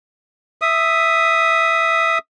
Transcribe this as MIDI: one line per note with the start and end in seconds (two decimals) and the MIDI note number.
0.62 2.18 76
0.62 2.18 87